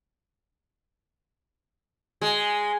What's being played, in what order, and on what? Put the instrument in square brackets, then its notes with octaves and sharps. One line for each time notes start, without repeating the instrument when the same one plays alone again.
[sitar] G#3